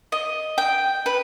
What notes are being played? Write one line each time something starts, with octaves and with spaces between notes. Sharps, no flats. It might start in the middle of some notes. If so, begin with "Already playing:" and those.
D#5
G5
B4